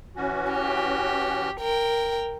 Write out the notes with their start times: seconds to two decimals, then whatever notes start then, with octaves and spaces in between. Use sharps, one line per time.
0.16 E3 C#4 F#4
0.52 G4
1.60 A#4 G5